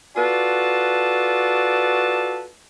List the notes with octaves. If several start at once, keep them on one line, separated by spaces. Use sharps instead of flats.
F4 F#4 A4 B4 D5 A5